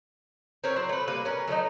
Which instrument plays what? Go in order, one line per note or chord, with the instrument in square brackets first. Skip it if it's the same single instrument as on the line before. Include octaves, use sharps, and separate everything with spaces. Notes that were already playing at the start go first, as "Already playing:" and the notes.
[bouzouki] C4 A#4 B4 C#5
F#3 E4 C5 F#5
A3 B4
G3 A#3 B4
C#4 A#4 B4
F#3 A3 C#4 D#4